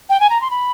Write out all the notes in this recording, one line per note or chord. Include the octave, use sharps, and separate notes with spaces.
G5
G#5
A#5
C6
B5